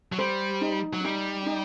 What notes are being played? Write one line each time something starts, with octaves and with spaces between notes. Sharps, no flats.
F#3
G3 C5
D#4
F#3
G3 D#4
D#4